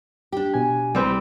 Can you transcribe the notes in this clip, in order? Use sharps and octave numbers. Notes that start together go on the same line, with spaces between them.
D4 G4
B2 G#5
C2 G3 C4 B4